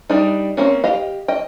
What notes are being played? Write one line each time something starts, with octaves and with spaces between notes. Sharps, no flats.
G3 D4 D#4
A#3 C4 C#4
G4 D#5 F5
D#5 G5